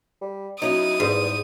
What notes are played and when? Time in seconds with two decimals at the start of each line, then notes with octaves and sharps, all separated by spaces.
0.21 G3
0.62 F#3 C#4 D#4 E4 D#6
1.00 E2 G#2 G3